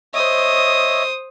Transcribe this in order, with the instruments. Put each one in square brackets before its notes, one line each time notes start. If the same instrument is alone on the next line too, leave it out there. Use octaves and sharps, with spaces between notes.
[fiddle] C5 D#6 [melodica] C#5 D#5 E5